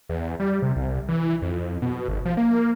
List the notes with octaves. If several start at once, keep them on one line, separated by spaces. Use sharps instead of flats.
E2
G3
C3
C2
E3
F2
B2
G#1
F3
A#3